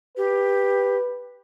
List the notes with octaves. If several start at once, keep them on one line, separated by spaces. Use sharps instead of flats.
G4 B4